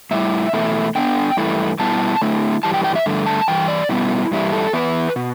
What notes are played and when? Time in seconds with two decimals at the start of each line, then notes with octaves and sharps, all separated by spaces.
0.11 A2 G3 E4 E5
0.53 E2 B2 A3 E4
0.95 D3 B3 D4 G5
1.37 G2 E3 A3 E4
1.79 B2 G3 B3 E4 A5
2.22 D3 A3 E4
2.63 G2 E3 G3 A5
2.74 G5
2.84 G5
2.96 E5
3.06 G2 D3 A3
3.26 A5
3.48 G2 E3 G5
3.68 D5
3.89 B2 G3 B3 E4
4.31 G2 E3 G3 E4
4.52 A4
4.73 E2 E3 B3 E4 B4
5.16 B2